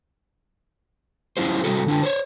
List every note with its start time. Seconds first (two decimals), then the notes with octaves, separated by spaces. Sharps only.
1.37 F#3 C#4 E4 F4 G4 C5
1.64 C3 G3 F#4 A4
1.86 D3 D4 F4
2.03 C5 C#5